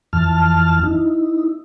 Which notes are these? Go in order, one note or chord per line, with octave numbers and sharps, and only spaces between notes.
F2 E3 A5 F6
D#4 E4